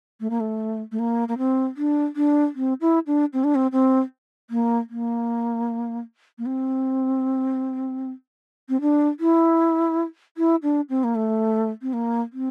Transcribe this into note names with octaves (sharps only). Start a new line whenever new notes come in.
A3
A#3
A3
A3
A#3
A#3
C4
D4
D4
C4
E4
D4
C4
D4
C4
C4
A#3
A#3
A#3
C4
C4
D4
E4
E4
D4
C4
A#3
A3
C4
A#3
C4